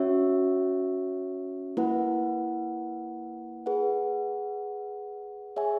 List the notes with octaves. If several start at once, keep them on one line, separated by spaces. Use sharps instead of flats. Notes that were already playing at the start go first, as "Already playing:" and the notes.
Already playing: C#4 F#4 C#5 E5
A#3 E4 B4 F#5
G#4 B4 F#5
G#4 C#5 E5 G#5